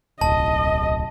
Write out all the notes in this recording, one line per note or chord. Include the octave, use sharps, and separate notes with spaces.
D1 B1 D#5 A5